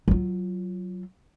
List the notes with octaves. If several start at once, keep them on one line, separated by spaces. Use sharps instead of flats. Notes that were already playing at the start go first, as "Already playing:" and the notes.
F#3 F4